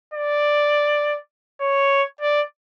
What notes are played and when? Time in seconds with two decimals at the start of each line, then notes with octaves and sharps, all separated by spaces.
0.14 D5
1.61 C#5
2.21 D5